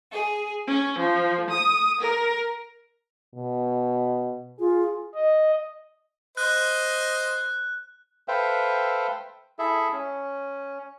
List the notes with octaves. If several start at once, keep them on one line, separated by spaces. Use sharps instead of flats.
G#4
C#4
F3
D#6
A#4
B2
F4 G#4
D#5
C5 D#5 F#6
A4 B4 C5 E5 F5 G5
E4 G#4 A4 E5
C#4